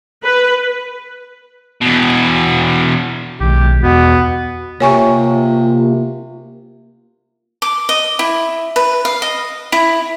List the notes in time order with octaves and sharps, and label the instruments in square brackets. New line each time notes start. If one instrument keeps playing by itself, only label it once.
[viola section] B4
[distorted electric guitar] E2 B2
[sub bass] B1 [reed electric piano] B2 D#3 G#3 [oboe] G4
[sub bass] E2 [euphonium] B2 [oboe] B3 [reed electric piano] F#4 F#5
[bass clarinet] C3 [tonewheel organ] A#3 F4 [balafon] C#5 G#5 C#6
[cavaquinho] D6
D#5
E4
B4
F5
D#5
E4